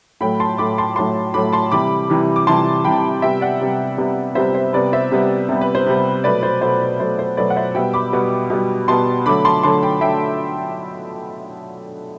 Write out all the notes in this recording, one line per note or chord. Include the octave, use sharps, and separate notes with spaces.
A2 F#3 A3 G5 B5
A5 C6
A2 F#3 A3 B5 D6
A5 C6
A2 F#3 A3 A5 C6
A2 F#3 A3 B5 D6
A5 C6
C3 E3 G3 B5 D6
C3 E3 G3
D6
C3 E3 G3 A5 C6
C3 E3 G3 G5 B5
C3 G3 B3 E5 G5
D5 F#5
C3 G3 B3
C3 G3 B3
C3 G3 B3 C5 E5
C5
C3 G3 B3 B4 D5
C5 E5
C3 G3 B3
C3 G3 B3
B4
C5
C3 G3 B3
B2 F#3 A3 B4 D5
C5
B2 F#3 A3 C5
B4
B2 F#3 A3 C5
C5
B2 F#3 A3 B4 D5
F#5
C5 E5
B2 G3 B3 E5 G5
B5 D6
B2 G3 B3
B2 G3 B3
B2 G3 B3 A5 C6
D3 F#3 A3 B5 D6
A5 C6
D3 F#3 A3 A5 C6
G5 B5
D3 F#3 A3 E5 G5